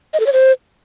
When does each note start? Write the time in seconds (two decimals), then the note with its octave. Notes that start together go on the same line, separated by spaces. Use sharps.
0.14 D#5
0.20 A4
0.26 C#5
0.33 C5